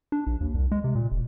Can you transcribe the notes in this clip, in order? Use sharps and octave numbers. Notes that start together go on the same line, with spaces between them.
D4
A#1
D#2
C2
G#3
C3
A#2
E1